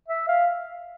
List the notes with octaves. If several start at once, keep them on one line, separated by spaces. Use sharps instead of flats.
E5
F5